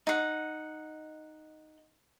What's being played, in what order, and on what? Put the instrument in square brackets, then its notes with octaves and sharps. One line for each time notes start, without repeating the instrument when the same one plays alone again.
[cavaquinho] D#4 F#5